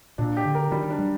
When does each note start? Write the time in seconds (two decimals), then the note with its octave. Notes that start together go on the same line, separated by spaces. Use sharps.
0.18 A#2 D4
0.37 G4
0.45 D3
0.55 A#4
0.72 D#3 G3
0.91 D4
0.99 G3